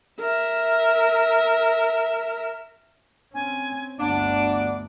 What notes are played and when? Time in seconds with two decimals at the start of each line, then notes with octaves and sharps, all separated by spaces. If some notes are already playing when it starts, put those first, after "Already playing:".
0.20 A#4 E5
3.34 C4 C#4 G#5
3.99 G1 D2 B3 D4 D6